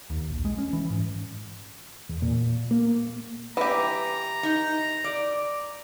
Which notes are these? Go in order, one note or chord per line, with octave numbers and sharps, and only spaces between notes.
D#2
A#1
G#3
C#4
E3
G#2
E2
A#2
A#3
E3 G4 A#5
D#4
D5